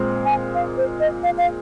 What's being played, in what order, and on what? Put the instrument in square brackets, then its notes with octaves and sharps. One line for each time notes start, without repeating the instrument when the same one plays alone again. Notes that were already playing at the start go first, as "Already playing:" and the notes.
Already playing: [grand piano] A#2 G#3 C4
[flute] G#5
F5
C5
D#5
F5
F5